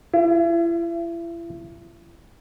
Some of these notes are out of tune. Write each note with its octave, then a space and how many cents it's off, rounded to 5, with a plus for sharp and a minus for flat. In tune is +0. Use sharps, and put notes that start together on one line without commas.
E4 +35